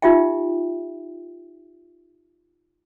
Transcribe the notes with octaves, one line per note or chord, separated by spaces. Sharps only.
D#4 F4 G4 E5 G5